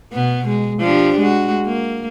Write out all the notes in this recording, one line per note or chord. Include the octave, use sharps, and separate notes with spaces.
B2 B3
G#3
F3 D4 G4
G#3 F#4
A#3